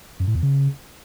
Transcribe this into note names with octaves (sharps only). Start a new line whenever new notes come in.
F#2
A2
E2
C#3